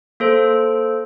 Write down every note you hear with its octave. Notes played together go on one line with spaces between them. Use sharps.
A#3 A4 C5